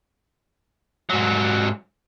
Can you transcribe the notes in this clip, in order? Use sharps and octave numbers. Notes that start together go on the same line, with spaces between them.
G#2 F#3